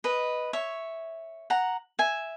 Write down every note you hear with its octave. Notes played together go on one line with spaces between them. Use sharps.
B4 D#5
C#5 E5
F#5 A#5
E5 G#5